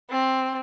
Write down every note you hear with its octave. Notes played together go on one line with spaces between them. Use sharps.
C4